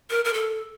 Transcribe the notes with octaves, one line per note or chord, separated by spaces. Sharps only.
A#4
A#4
A4